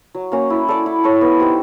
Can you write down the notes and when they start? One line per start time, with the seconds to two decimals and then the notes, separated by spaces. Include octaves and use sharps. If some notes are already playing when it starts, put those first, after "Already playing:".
0.15 F#3
0.32 A#3 C#4 F#4
0.50 E4
0.68 A4 D5
0.86 E4
1.04 A4 C#5
1.21 B3
1.39 D#4 G4 C5